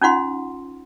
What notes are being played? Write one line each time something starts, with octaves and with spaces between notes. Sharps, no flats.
C#4 D#4 F4 F#5 C6